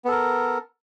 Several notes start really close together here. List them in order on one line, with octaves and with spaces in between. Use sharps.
B3 A4 A#4